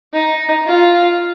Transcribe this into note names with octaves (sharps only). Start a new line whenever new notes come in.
D#4
F4